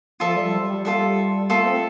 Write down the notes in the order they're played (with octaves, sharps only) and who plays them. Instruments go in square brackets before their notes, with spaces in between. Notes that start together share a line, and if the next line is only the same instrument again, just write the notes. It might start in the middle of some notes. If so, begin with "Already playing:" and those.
[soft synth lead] F3 [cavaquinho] F4 A4 E5
[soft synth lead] G3
G3
G3
[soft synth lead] G3 [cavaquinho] F4 A4 E5
[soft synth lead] A3 [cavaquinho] F4 A4 E5
[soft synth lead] C4